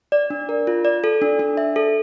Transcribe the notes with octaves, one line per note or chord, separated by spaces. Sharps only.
D5
D4
A#4
F4
D5
A4
D4
D4
E5
A4